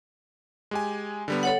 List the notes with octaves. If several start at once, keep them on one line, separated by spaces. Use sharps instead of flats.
G#3 G4 G#5
D3 G3 B3
A4 C#5 F#5